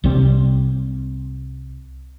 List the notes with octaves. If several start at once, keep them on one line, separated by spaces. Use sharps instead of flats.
C2 C3 G3 C4